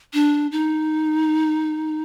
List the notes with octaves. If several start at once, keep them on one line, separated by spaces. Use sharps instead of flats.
D4
D#4